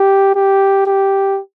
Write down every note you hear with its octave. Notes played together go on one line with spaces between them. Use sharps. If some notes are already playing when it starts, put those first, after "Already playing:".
Already playing: G4
G4
G4